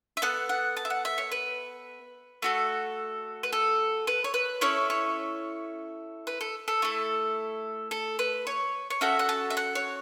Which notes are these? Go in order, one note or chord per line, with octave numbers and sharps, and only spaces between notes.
E5
B3 A4 F#5
F#5
A5
E5
F#5
E5
C#5
B4
A3 F#4 A4
B4
A4
B4
C#5
B4
C#4 E4 A4 C#5
C#5
B4
A4
A4
A3 E4 A4
A4
B4
C#5
C#5
C#4 F#4 A4 E5
F#5
A5
E5
F#5
C#5